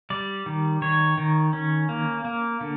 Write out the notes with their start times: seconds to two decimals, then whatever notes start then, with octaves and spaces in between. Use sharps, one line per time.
0.10 G3 D5
0.46 D#3
0.82 D#3 C#5
1.18 D#3
1.53 C#4
1.89 A#3
2.25 A#3
2.61 D3